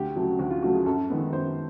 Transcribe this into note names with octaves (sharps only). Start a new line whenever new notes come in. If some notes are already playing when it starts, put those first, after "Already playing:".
Already playing: D2 G4
C#3 F#3 A3
D2 F#4
F4
C#3 F#3 A3 F#4
G#4
F#2 A4
D#3 G#3 B3
F#2 C5